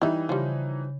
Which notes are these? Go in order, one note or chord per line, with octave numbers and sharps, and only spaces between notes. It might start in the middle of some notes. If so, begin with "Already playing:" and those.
E3 G3 D#4 E5
C#3 F3 G3